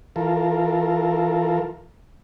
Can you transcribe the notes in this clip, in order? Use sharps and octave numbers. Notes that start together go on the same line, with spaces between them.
E3 F4 A4 A#4